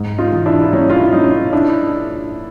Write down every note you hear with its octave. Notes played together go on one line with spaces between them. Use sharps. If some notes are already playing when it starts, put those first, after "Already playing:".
Already playing: G#2
D#4 F4
E3
D4 E4
E4
A#1 C#4 D#4
F4
E4
A#1 C#4 D#4
D4 E4